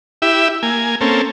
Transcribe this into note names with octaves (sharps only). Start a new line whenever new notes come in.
E4 G4 E5
A#3 G#5
A#3 C4 C#4 A4